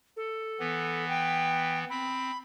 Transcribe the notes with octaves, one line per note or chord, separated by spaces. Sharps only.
A4
E3 B3
G5
C4 B5